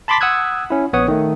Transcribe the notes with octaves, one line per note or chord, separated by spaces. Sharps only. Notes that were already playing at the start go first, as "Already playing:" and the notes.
A5 B5 C6 D6 A6 B6
F#5 D#6 E6 F#6 G#6
C#4 E4
A#1 B3 C#5 F#5 D#6
D#3 A3